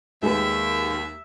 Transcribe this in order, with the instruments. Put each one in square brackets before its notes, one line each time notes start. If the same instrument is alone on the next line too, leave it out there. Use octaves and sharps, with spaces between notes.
[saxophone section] D#2 [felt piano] G#3 B4 [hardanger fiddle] E5